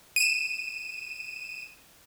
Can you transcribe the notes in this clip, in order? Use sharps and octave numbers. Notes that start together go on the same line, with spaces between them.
D#7 E7